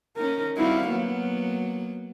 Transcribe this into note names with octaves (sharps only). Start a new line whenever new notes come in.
C#4 D#4 A#4
G3 C4 E4 F#4 F5
F#3 A#3 B3